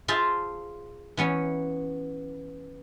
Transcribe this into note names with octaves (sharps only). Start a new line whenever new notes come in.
F4 G#4 C5 E5 A5
E3 B3 C#4